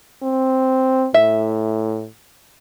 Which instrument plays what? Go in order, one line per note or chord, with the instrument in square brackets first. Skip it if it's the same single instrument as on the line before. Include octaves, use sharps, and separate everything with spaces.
[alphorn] C4
[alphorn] A2 [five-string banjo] E5